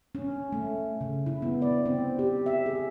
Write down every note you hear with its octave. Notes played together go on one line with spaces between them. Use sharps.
C#4
A3
C#3
E4
B3
D5
C4
G4
E5
G#4